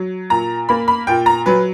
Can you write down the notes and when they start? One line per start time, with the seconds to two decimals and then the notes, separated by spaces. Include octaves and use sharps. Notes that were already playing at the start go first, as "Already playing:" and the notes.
Already playing: F#3
0.30 A#2 A#5
0.69 A#3 B5
0.88 B5
1.07 A#2 G5
1.26 A#5
1.46 F#3 B4